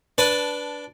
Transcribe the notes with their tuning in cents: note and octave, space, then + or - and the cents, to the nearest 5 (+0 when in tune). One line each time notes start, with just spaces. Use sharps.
D4 -10 B4 +0 A5 +0